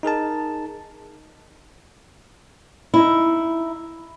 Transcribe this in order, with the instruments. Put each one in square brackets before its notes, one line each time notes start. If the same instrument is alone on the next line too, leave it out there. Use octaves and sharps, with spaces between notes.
[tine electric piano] D#4 G#4 A#4 A5
[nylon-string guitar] D#4 E4